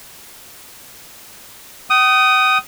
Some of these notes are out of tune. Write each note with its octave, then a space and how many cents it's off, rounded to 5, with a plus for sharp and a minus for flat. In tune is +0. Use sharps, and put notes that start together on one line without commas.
G5 -45 D#6 +0